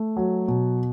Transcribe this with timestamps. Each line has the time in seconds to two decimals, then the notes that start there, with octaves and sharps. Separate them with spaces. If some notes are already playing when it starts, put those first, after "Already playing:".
Already playing: A3
0.17 F#3
0.48 B2